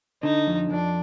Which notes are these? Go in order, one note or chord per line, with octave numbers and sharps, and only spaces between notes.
D3 D#4
F2
F2 D4